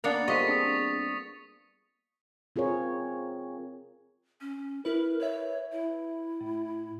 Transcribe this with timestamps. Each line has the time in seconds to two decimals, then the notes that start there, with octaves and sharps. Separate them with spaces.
0.04 A#3 B3 D4 A#4 A6 C#7 F7
0.28 F3 G3 A4 D#5 C#6 B6
0.47 C4 D4 G#4 D#6 C#7
2.56 C4 F4 G#4 A#4 C#5
4.41 C#4
4.85 E4 A#4 B4
5.20 B4 C#5 E5
5.72 E4
6.40 A2